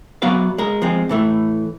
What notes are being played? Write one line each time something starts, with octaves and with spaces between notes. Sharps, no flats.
F#3 B3 F#4 D5 E5 F5
G#3 A#4
F3 G#3 C4
A2 E3 A3